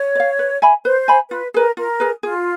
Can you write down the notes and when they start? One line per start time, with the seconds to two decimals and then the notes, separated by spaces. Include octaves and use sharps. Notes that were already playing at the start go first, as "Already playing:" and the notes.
Already playing: C#5
0.15 D5
0.20 F5
0.39 B4
0.62 E5 G#5 B5
0.85 B4 C5
1.08 E5 G#5 B5
1.31 F4 B4
1.54 G#4 A#4 B4
1.77 F4 A#4
2.00 G#4 B4
2.23 F4 G#4